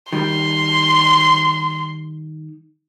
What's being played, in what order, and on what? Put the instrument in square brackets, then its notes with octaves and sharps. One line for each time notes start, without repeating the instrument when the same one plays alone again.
[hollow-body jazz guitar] D#3 G3 [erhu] C6